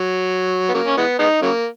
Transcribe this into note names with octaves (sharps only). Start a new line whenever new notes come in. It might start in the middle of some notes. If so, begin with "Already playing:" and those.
Already playing: F#3
B3
C#3 F#3 A#3
C#4
E3 G#3 B3
G#3 B3 D#4
C#3 F#3 A#3